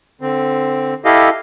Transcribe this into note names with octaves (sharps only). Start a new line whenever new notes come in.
D3 C4
E4 G4 A4 D#5 F5